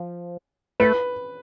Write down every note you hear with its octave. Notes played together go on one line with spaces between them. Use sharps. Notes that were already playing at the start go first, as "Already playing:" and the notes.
Already playing: F3
A3 B4